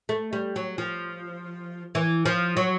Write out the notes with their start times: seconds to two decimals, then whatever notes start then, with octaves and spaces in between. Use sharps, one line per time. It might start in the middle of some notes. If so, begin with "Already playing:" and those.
0.09 A3
0.33 G3
0.56 F#3
0.78 F3
1.95 E3
2.26 F3
2.57 F#3